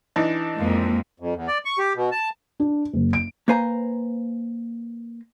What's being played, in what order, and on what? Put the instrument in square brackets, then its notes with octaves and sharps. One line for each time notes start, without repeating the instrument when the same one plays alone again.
[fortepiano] E3 D4 D#4
[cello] F2 G#3 [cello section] A#3
[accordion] F2
E2
D5
C#6
G4
B2
A5
[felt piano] D4
F#1
D7
[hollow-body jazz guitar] A#3 B4 C5 G#5 A#5